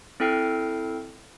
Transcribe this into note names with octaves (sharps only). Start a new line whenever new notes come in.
C4 E4 A4 G5 F6 C7